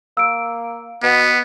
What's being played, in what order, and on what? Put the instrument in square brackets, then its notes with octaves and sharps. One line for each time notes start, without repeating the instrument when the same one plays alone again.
[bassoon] A#3 [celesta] E6 D7
[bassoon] B2 [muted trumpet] B3